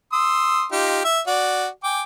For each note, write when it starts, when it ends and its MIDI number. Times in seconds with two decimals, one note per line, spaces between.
0.13 0.65 84
0.13 0.65 87
0.13 0.65 88
0.72 1.01 63
0.72 1.01 65
0.72 1.01 67
1.04 1.20 76
1.27 1.67 66
1.27 1.67 74
1.84 2.03 79
1.84 2.03 80
1.84 2.03 86